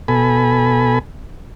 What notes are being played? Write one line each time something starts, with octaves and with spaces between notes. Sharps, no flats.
B2 A4 G#5 B5